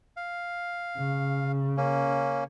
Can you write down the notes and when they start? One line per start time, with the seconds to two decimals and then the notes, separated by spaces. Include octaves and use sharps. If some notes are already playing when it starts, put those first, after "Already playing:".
0.17 F5
0.97 C#3
1.77 A#3 C#4